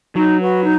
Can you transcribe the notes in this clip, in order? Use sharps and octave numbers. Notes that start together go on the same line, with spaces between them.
F#3 D#4
F#4 B4
D#4